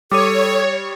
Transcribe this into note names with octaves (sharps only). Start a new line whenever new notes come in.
G3 A4 C#5 D6 D#6 D#7